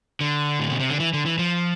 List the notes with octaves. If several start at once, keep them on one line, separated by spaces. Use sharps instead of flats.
D3
A2
B2
C3
D3
E3
D3
E3
F3